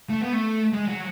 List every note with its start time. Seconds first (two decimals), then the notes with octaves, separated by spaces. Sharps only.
0.09 A3
0.21 B3
0.33 A3
0.73 G#3
0.88 F#3